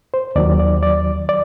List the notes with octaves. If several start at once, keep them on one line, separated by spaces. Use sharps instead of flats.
C5
D#2 D#3 F#3 D5
D5
D5
D5